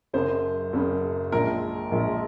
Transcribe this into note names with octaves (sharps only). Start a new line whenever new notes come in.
F#1 F#2 C#3 C5
F#1 F#2 C#3
A#1 A#2 F3 G#3 A#4
A#1 A#2 F3 G#3